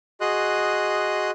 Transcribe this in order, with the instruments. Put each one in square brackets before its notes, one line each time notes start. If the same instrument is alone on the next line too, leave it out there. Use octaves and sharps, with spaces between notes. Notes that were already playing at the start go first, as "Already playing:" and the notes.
[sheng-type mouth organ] F#4 G#4 D#5 C6 D#6 F#6